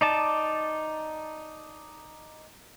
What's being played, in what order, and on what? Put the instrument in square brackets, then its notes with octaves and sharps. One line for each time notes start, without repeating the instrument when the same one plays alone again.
[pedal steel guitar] D#4 D5 A5